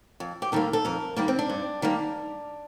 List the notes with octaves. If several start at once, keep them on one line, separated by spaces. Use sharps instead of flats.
F2
G4
D#3 G3 A#3 A4
A4
F2 A#4
D#3 G3 A#3 D4
C4
D4
G2
D#3 G3 A#3